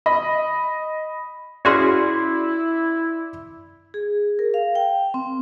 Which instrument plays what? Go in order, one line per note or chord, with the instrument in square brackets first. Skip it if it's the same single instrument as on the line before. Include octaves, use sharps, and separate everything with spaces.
[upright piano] D#5 B5
[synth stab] C#4 F#4 G#4 [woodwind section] E4 [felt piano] D5 C6
[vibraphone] G#4
A#4
F5
G5
C4